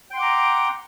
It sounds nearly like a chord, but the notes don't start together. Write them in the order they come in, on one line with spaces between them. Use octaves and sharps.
G5 C6 F#5 D6 A#5